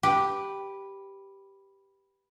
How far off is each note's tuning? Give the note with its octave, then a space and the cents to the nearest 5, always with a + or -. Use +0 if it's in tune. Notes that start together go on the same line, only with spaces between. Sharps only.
G4 +0 B4 -5